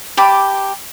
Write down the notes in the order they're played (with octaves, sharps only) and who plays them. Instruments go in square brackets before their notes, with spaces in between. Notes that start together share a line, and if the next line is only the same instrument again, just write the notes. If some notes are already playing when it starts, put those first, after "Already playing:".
[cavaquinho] G4 A5 B5 D6